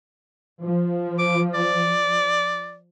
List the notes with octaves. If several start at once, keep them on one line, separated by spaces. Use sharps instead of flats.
F3
D6
D5